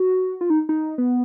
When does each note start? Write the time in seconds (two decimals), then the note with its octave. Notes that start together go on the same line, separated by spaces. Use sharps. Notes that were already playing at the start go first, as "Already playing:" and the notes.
Already playing: F#4
0.41 F4
0.50 D#4
0.69 D#4
0.98 B3